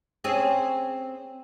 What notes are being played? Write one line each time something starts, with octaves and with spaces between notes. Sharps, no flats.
C4 C#4 G#4